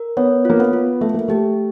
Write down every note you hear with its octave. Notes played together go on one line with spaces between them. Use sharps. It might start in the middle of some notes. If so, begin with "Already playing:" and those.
Already playing: A#4
B3 C#5
A#3 F4
B3
F4
A3 E5
A#3
A3 G4